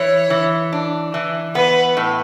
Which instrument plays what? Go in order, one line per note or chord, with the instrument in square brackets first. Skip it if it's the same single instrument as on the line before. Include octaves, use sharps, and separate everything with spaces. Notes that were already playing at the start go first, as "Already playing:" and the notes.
Already playing: [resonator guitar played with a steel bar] E3 [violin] C#5
[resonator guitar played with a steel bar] E3
D4
E3
[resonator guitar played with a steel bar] B3 [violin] B4
[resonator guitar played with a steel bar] A2